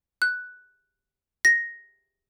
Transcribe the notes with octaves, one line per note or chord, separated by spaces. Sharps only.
F#6
A#6